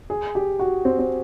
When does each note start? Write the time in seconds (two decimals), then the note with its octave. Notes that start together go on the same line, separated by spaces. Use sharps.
0.10 G#4
0.35 G4
0.59 F#4
0.85 C4
0.99 C4